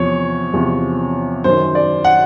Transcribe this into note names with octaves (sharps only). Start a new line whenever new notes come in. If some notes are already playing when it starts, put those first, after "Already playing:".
Already playing: E2 C3 F3 C#5
E2 C3 F3
F#2 D#3 C5
D5
F#5